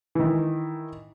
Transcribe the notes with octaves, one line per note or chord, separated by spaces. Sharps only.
D#3 E3